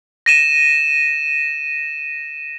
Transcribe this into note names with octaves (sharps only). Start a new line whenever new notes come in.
A#6 D#7 E7